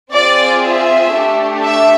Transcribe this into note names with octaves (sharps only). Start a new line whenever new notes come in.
C4 F4 G#4 D5
E5
A3 D4 G4
E5